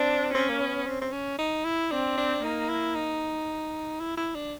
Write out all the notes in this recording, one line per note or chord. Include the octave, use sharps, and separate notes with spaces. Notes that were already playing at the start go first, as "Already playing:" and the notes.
Already playing: C4 D4
C4 C#4
A#3
B3
C4
C4
C#4
D#4
E4
C4 D4
D4
A#3 D#4
E4
D#4
E4
E4
D4